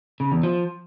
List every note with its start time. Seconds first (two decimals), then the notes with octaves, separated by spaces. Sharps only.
0.20 C#3
0.32 E2
0.43 F3